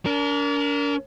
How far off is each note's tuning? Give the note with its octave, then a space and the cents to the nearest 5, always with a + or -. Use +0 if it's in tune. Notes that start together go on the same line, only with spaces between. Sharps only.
D4 -40 A#4 +0